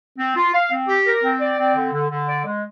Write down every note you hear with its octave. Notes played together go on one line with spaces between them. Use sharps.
C4
F4
F5
C4
G4
A#4
C4
D5
C4
D3
D3
D3
D5
G#3